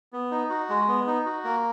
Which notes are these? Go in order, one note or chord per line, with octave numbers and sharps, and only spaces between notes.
B3
D#4
F#4
G#3
B3
D#4
F#4
A#3